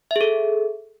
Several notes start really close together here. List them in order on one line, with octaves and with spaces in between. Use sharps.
E5 G#4 A4